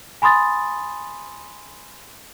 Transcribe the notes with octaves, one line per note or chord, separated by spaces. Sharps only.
G#5 B5 C6 D#6 A6